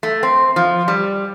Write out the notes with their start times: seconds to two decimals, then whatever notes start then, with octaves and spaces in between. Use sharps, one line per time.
0.03 A3
0.23 C4
0.56 F3
0.88 G3